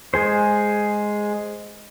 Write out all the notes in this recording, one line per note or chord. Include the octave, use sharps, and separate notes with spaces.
G#3 G#4 C5